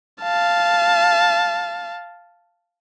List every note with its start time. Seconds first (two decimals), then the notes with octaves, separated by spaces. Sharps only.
0.23 F5 A5